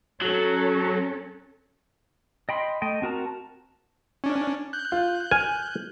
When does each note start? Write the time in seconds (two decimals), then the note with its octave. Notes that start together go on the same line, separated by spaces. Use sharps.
0.22 F#3 C#4 A4 C#5
2.49 D#5 G5 B5 C6
2.82 A3 D#5 G5
3.02 C4 F#4 A#4 A5
4.24 C#4 D4
4.73 F#6 G6
4.92 F4
5.31 G#5 F6